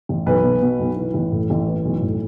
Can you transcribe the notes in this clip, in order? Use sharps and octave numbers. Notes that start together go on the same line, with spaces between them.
A1
B1 B4
B2
B2
B1
E3
A1
A2
A1
E3
B1
A2